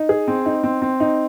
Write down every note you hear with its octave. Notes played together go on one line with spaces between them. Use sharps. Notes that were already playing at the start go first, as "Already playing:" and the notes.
Already playing: D#4
G#4
C4
D#4
C4
C4
D#4